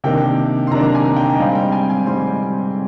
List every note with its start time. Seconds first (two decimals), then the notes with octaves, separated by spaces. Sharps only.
0.04 C3 D#3 A#3 D4 G5
0.67 C6
0.71 C3 D#3 A#3 D4 A#5
0.94 G#5
1.16 G5
1.35 D#5
1.39 G#2 G3 C4 F5
1.55 G5
1.72 G#5
1.90 G#5
2.06 G#2 G3 C4 C6